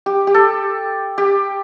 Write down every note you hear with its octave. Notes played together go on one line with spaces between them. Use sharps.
G4
G4
A4
G4